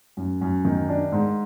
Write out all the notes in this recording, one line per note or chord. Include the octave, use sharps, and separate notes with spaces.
F#2
F#2
D#3
D4
G#2